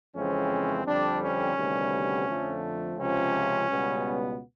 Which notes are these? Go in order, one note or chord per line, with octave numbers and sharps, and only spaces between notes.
F2 C#3 E3 G#3 C4 C#4
F2 D3 G3 C4 D4
C#4
D2 C3 D#3 G3 B3
F2 D3 F3 A3
C#2 C3 F3 C#4
C#2 B2 G3 B3